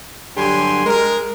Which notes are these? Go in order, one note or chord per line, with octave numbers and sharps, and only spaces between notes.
G2 D3 F#3 G4 G#5 C6
G#3 A#4